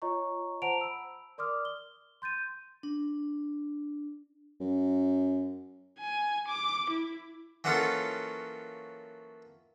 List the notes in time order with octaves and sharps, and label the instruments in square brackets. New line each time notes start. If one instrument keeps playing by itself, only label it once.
[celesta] F4 C#5 D#5 A#5 C#6
C5 F#5 A5 A#5 D7 F7
B5 E6
A#4 D5 C6 D6 D#6 F6
G7
C6 G6 A6 D#7
[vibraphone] D4
[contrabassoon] F#2
[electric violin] G#5
D6
E4
[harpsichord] E3 F#3 A#3 C#4 F4 A4